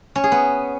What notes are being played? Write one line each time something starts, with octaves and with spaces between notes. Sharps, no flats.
C#4
G#4
B3